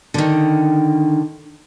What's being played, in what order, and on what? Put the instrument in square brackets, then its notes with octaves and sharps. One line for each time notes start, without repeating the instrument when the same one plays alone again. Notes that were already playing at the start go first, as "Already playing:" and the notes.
[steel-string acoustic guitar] D3 D#3